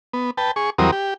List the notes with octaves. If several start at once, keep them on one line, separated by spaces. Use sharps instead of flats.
B3
B4 G5 A5
G#4 C#6
E2 F#3 G3 C4 A#4 D#6
G4